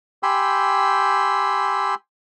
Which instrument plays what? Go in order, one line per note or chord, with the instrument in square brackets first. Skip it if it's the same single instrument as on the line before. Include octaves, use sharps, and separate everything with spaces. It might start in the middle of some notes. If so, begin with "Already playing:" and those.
[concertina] G4 G5 G#5 B5 C6 E6